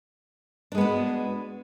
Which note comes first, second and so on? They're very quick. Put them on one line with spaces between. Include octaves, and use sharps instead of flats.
D4 G#3 B3 F#4